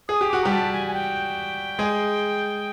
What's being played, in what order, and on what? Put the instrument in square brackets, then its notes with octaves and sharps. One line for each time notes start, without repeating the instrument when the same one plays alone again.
[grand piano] G#4 [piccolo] D#6
[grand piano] G4
[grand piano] F#4 [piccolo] D6
[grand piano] G3 G4 [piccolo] A#5
[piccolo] A5
G#5
G#5
G5
[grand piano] G#3 G#4